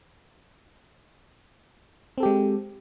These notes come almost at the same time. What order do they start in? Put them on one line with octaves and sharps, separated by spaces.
C4 A4 G4 G#3